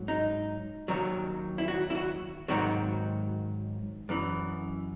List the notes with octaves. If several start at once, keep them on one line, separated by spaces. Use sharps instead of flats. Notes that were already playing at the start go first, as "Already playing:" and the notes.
Already playing: G#2 F#3
D#4
D#2 D#3 F#3
E4
F#4
E4
F#4
G#2 D#3 F#3 F#4
F#2 E3